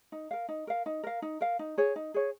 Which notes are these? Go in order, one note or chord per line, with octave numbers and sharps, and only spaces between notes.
D#4
A#4 F5
D#4
A#4 F5
D#4
A#4 F5
D#4
A#4 F5
D#4
G#4 C#5
D#4
G#4 C#5